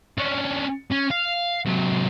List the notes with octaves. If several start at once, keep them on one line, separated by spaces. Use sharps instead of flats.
C#4 D4
C#4
F5
C3 F#3